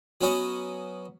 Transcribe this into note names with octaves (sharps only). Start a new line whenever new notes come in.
F#3 B3 C#4 F#4 D#5